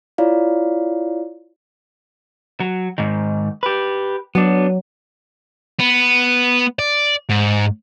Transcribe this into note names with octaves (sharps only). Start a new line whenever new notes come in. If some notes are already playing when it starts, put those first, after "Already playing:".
E4 F4 C#5 D5 F5
F#3
G#2 D#3
G4 B4
F#3 B3 D4
B3
D5
G#2